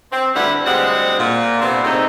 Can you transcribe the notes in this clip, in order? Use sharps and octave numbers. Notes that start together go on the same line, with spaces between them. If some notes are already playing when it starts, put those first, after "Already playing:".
C4
D2 D3 G3 E4 B4 F#5
D2 G3 G#3 C4 F#5
A#2
C3 B3 C4 D4
G#2 C3 A3 C4 D#4